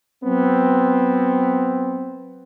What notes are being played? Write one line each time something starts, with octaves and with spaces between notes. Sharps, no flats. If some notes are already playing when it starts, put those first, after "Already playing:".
F#3 B3 C4